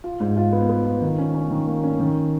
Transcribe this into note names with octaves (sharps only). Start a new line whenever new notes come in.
F4
G#2
F4
B3
B3
F4
D#3
C#4
C#4
D#3
A#3
C#4
D#3